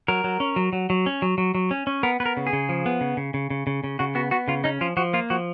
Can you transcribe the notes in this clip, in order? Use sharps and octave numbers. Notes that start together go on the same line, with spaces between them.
F#3 A#4
F#3
C#4
F#3
F#3
F#3
C#4
F#3
F#3
F#3
C#4
C#4
B3 A#4
B3 B4
A#4
C#3
G#4
C#3
F3
B3
C#3
C#3
C#3
C#3
C#3
C#3
C#3 F#4
B3 F#4
B3 F#4
C#3 F4
C#4 D#4
F3 F4
F3 F#4
A#3 F4
F3 F#4